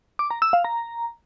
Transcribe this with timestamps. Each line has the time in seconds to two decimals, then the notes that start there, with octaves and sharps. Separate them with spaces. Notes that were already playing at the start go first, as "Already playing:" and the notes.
0.19 D6
0.31 A#5
0.42 E6
0.53 F5
0.64 A#5